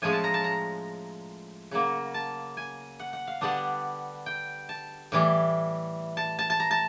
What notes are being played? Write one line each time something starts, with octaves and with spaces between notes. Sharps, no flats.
A2 F3 G#3 C#4 G#5
A5
A#5
A5
A#5
C#3 F#3 A#3
A5
G#5
F#5
F#5
F5
D3 G3 B3 D4 F#5
G5
A5
A2 E3 G3
A5
A5
A5
A#5
A5